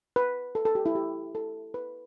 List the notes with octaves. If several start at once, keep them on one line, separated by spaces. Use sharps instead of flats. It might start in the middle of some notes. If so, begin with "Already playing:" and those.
B4
A4
A4
G4
E4
G4
A4
B4